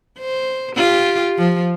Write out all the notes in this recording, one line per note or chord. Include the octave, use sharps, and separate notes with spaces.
C5
F4 G4
F3